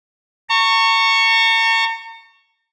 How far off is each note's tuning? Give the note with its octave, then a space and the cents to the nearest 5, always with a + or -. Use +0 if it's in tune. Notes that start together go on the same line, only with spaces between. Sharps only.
A#5 -45 C#6 +0